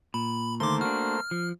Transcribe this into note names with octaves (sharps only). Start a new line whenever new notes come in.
A#2 B5
D2 D#3 A3 A#3 C5 C6 D6
D4 F#4 F6
F3